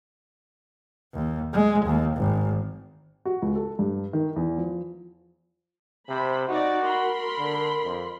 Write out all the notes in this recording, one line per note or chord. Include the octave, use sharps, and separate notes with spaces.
D#2
G#3
D#2
G#1
F#4
C#2
A4
G2
D#3
E2
F3
C3 C5 B5
D#4 F#4 D5
A#4 B5 C6
D3
F2